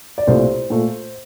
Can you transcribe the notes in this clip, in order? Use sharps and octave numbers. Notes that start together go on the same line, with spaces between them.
D5
C2 A#2 A3 C5
A#2 A3